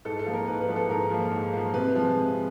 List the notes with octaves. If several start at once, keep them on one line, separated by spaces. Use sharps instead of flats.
G#2 A4
A4
F3 A#3
A#4
G#2 B4
B4
F3 A#3
A4
G#2 A#4
F3 A#3
G#2
F3 A#3
C3 B4
F3 G#3
C3